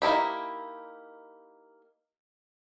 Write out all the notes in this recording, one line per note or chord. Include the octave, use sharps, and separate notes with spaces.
A#3 D#4 E4 G4